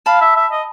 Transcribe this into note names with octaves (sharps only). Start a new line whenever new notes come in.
F5 A5 B5
E5
E5
D#5